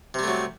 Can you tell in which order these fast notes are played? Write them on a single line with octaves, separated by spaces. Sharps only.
C3 G3 A3 F#3